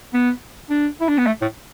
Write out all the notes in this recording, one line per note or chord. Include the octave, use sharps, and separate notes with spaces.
B3
D4
E4
D4
B3
A3
A2